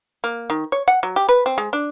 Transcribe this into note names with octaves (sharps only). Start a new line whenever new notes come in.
A#3
D#3
C#5
F#5
F#3
G4
B4
C4
G#3
D4